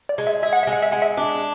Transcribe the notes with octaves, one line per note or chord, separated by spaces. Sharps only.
D5
G#3
E5
G#4 E5
F#5
G#3 E5
F#5
E5
G#3 F#5
E5
D4